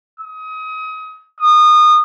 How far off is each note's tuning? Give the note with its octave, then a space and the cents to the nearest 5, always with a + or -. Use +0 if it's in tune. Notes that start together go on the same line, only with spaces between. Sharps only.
D#6 +30
D#6 -25